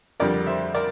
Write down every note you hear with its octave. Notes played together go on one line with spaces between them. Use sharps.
F2 D3 G3 A#4 D5
C5 E5
A#4 D5